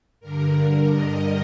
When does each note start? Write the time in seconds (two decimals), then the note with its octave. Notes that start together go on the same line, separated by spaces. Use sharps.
0.20 G2 D3 A#4
0.91 D#5